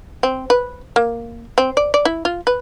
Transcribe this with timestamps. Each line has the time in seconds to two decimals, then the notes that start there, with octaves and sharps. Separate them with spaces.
0.23 C4
0.50 B4
0.96 A#3
1.58 C4
1.77 D5
1.94 D5
2.05 E4
2.25 F4
2.47 B4